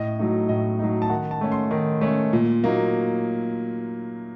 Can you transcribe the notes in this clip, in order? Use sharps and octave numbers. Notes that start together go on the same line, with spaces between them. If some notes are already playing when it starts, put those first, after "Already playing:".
Already playing: A2 D#5
F#3 A3 D#4
A2 D#5
F#3 A3 D#4
A5
D#3 F#5
A5
A3 C#4
C6
D#3
A3 C#4
A#2
F#3 A#3 D#4